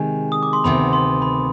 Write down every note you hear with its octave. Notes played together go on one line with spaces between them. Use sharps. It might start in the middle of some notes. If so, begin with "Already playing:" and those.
Already playing: C3 D#3 G#3 G#5
D#6
D6
C6
D2 C3 D#3 B3 B5
C6
B5